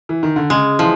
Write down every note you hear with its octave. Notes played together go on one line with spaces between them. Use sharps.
E3
D#3
D3
C#3 G#3
E3 F3